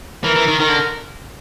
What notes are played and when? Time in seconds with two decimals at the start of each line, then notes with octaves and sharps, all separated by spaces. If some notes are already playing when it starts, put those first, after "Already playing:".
0.24 E3 A#4
0.36 E3
0.48 D#3
0.59 D#3 A#4
0.69 D3